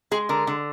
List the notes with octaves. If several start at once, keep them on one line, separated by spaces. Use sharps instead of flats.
G#3 G#4
D3 A#4
D3